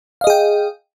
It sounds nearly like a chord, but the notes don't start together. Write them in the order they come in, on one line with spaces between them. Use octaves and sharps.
F5 D#5 G#4 G5